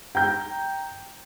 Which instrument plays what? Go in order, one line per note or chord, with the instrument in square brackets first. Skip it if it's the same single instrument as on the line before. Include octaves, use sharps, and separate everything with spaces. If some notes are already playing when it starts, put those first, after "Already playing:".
[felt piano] G5 A#5 G6